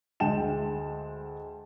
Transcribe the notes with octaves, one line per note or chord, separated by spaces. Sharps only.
D2 D3 G#3 G5 A5 E7